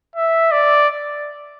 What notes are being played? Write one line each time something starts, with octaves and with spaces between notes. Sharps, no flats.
E5
D5